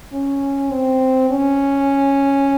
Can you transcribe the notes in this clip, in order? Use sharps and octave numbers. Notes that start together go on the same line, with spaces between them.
C#4
C4
C#4